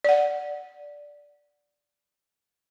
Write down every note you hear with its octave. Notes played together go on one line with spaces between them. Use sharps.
D5 F#5